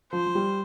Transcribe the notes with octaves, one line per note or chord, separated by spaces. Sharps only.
F3 C5
F3
G3